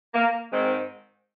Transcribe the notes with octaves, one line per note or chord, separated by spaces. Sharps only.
A#3
G#2 D#3 G#3 C4